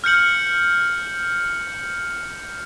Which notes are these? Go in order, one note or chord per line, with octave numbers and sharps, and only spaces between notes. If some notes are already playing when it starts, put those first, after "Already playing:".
F6 G6 C#7 F#7